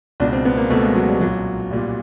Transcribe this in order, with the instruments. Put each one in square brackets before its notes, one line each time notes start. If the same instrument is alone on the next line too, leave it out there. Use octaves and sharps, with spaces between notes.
[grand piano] C#2 B2 D4
C4
B3
A#3
C#2 B2 A3
G#3
F#3
G3
B1 A#2 F#3
B1 A#2 G3